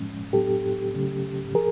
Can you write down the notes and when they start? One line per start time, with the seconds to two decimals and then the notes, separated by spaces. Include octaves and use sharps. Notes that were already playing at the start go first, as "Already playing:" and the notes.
Already playing: A2 F3 G#3 C#4
0.33 A2 F#3 B3 D4 G4 A4
0.94 C#3 F#3 A3 C#4
1.55 F3 G#4 A#4